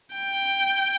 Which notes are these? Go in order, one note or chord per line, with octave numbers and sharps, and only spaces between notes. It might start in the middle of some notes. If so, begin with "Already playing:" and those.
G5